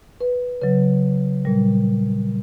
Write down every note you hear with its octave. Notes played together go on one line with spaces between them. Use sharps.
B4
C#3 F#3 B4
A#2 G3